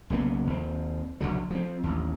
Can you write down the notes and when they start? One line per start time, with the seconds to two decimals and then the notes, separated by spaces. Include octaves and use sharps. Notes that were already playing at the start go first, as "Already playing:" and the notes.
0.10 B1 C#3 A#3 B3
0.47 D#2 C4
1.21 A#1 D#2 D3 F#3
1.50 F3 C4
1.83 A1 D#2